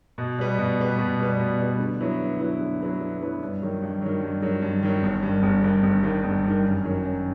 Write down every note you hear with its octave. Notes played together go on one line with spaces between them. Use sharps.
B2
G3 B3
B2
G3 B3
B2
G3 B3
B2
G3 B3
D3
F#3 B3 E4
D3
F#3 B3 E4
D3
F#3 B3 E4
D3
F#3 B3 E4
G2
D#3 F#3
G2
D#3 F#3
G2
D#3 F#3
G2
D#3 F#3
G1
G2
D#3
G1
G2 D#3
G1
G2 D#3
G1
G2 D#3
F#2
D#3 F#3
F#2